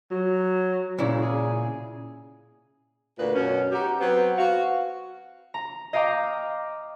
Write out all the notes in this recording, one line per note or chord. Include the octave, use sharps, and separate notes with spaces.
F#3
A#2 C#3 E4
G#4
D2 A#2 D4 B4
F#2 B2 C#4
D#4 F#4 G4
F#3 B3 C4 B4
F#4 F5
A#5
D#5 F5 G5 A#5 D6